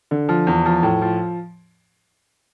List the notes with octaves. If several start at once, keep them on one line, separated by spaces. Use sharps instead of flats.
D3
F3
E2
F3
A2
F3